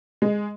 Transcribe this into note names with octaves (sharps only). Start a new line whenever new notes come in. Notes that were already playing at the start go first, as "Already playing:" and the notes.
G#3